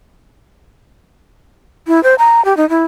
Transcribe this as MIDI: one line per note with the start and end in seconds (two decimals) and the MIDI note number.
1.87 2.02 64
2.03 2.15 72
2.19 2.43 82
2.45 2.56 67
2.57 2.68 63
2.69 2.85 64